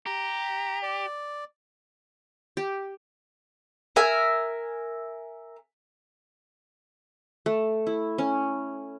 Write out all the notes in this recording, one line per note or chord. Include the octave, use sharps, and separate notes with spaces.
G4 A#5
D5
G4
A#4 E5 G#5
A3
E4
C#4